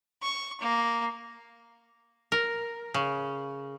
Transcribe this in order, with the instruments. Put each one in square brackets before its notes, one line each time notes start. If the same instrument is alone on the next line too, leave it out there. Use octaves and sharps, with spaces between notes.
[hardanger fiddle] C#6
A#3
[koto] A#4
C#3